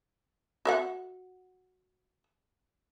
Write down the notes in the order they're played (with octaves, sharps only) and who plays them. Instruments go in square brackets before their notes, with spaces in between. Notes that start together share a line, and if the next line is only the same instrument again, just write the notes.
[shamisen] F#4 E5 F#5